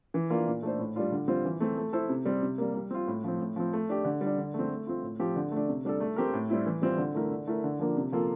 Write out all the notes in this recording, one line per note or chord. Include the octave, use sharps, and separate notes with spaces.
E3
A#3 D4 F4
A#2
A3 D4 A4 C5
A2
G3 D4 F4
D3
G3 C4 F4 C5
E3
A3 C4
A3
E4 A4 C5
C3
G3 C4
C3
G3 A#3
G3
C4 F4
A2
F3 C4
A2
F3 C4
A3
D4 G4
D3
G3
D4
D3
A3
C4
A3
C4 F4
A2
F3 C4 G4
D3
A3
D4
C3
G3 D4 A4
A3
C4 G4 A#4
A2
G3 C4 E4
E3
G3 C4 F4 C5
D3
A3 E4 A#4
D3
A3 E4 A#4
D3
F3 A#3 D4
C3
F3 A#3 F4 A4